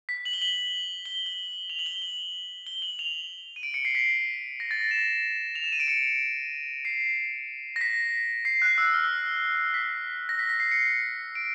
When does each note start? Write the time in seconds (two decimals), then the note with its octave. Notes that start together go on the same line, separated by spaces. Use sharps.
0.09 B6
0.25 F#7
0.33 G7
0.41 F#7
1.05 G7
1.26 G7
1.70 F7
1.79 F#7
1.86 G7
2.02 F#7
2.66 G7
2.82 F#7
2.99 F7
3.56 D#7
3.63 D7
3.74 C#7
3.85 C7
3.95 B6
4.60 A#6
4.71 A6
4.81 A#6
4.91 E7
5.55 F7
5.64 E7
5.72 D#7
5.80 D7
5.88 C#7
6.85 C7
7.76 A#6
7.81 B6
8.45 C7
8.62 F#6
8.78 E6
8.94 F6
9.74 B6
10.29 A#6
10.39 B6
10.49 B6
10.60 C7
10.71 C#7
11.35 D7